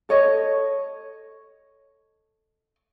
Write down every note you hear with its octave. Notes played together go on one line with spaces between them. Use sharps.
A4 C#5 D#5